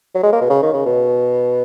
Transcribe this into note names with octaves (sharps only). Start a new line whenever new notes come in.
F#3
G#3
A#3
B2
C#3
D#3
C#3
B2